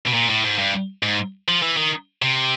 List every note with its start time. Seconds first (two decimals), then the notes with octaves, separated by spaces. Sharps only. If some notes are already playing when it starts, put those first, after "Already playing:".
0.06 B2
0.13 A#2
0.29 A2
0.44 G#2
0.58 G2
1.03 G#2
1.48 F3
1.62 E3
1.77 D#3
2.22 C3